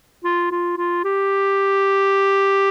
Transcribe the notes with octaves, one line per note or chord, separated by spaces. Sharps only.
F4
F4
F4
G4